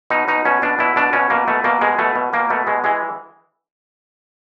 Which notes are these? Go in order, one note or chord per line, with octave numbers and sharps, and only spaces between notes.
B2 D#4
B2 D#4
B2 C#4
B2 D4
B2 E4
B2 D4
B2 C#4
B2 A#3
B2 A3
B2 A#3
B2 G#3
B2 A3
B2
B2 A#3
B2 A3
B2 G#3
E3 G#3